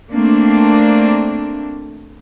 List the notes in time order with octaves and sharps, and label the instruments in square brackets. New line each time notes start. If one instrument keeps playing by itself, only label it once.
[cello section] A3 A#3 C4 D4